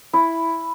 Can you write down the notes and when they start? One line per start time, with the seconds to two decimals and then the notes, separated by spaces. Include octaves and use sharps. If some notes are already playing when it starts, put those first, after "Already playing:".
0.13 E4